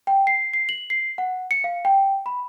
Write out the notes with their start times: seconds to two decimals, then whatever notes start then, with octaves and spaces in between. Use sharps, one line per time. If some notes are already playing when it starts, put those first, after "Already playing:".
0.07 G5
0.27 C7
0.54 C7
0.69 F#7
0.90 C7
1.18 F#5
1.51 C#7
1.64 F5
1.85 G5
2.26 B5